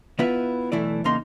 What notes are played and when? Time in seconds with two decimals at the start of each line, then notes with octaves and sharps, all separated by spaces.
0.19 D#3 B3 E4 F4 B4 E5
0.72 B1 E3 A3 E4 D5
1.04 E2 C#3 A#3 D#4 C6